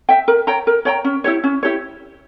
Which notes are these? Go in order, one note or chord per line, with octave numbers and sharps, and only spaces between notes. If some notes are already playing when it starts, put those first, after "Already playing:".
E5 G5
A#4
C#5 G5 A#5
A#4
C#5 G5 A#5
C#4
E4 G4 C#5
C#4
E4 G4 C#5